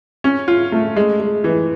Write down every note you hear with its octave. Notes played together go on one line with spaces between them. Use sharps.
C#4
F4
A3
G#3
G#3
E3